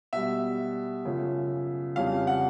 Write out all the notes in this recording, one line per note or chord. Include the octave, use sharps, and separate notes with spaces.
B2 G3 E5
F#2 C#3 F3
F2 C#3 E3 G3 F5
F#5